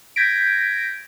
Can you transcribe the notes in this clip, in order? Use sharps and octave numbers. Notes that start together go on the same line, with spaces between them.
G6 G#6 A#6 B6 D7